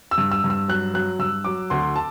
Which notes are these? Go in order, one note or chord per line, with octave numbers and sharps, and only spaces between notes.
E6
G2
E6
G2
E6
F#3 F#6
F#3 F#6
G2 E6
F#3 D6
D2 C6
A5